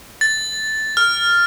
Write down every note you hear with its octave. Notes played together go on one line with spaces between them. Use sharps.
A6
F6